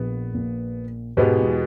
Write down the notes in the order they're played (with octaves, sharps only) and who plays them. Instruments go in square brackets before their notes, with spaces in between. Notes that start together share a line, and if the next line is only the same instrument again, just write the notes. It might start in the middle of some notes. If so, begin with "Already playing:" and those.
Already playing: [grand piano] A#1 A#2 [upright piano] B3
[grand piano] A#1 A#2
[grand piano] G#2 [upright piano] B2 G#3 B3 G4
[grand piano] E2 E3